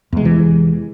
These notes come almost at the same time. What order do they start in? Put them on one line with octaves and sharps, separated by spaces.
E2 G#3 C3 E3